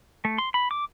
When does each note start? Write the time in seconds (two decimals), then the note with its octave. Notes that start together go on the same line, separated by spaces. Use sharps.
0.25 A3
0.38 C6
0.54 B5
0.71 D6